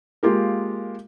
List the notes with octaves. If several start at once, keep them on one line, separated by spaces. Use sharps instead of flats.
G#3 A#3 F4 G4 A#4